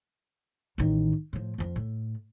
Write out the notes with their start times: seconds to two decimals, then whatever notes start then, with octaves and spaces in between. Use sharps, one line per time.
0.78 A1 D#3
1.33 A2 F3
1.58 F2 F3
1.76 A2